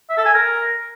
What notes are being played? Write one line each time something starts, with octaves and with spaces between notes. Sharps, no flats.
E5
A4
G#5
A#4